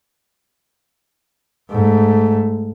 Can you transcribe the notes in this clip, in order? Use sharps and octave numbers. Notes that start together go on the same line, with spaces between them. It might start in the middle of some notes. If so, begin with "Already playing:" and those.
G#2 A3